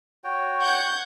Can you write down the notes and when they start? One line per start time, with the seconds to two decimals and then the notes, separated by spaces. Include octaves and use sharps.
0.24 F#4 C#5 G5
0.61 F#5 G6 G#6